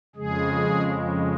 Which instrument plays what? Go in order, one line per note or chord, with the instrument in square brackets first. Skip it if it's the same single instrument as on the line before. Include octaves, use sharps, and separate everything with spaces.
[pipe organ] F2 C#3 G#3 G#4